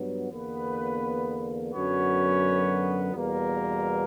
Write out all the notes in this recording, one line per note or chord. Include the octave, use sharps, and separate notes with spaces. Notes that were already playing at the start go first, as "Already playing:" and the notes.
Already playing: G2 F#3 B3
E2 D3 A#3 B3 B4
F#2 D3 F#3 B3 C#4 C#5
E2 B2 G3 A#3 A#4